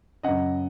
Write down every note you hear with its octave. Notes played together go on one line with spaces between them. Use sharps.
F#2 C#3 D#5 F#5